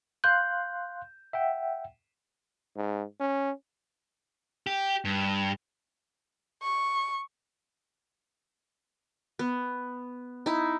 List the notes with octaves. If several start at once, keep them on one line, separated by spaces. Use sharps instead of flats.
F5 C6 F#6 G6
E5 F#5 G5
G#2
C#4
G4
G2
C#6
B3
D#4 E4